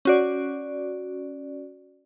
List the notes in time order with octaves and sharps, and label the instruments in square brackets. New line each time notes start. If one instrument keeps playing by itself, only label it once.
[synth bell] C#4 F#4 D5